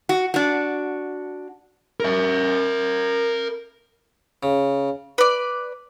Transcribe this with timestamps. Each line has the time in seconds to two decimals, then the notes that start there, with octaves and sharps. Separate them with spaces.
0.09 F#4
0.34 D4 F#4
2.00 A#4 E5
4.43 C#3
5.18 B4 D5